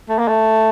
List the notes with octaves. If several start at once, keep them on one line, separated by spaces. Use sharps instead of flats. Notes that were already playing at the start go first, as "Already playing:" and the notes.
A3
A#3
A3